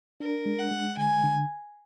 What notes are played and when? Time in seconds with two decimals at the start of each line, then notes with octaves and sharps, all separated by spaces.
0.20 D4 A#4
0.46 G#3
0.59 F#5
0.71 G#3
0.97 D3 G#5
1.24 D3